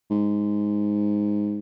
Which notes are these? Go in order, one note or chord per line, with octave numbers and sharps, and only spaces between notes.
G#2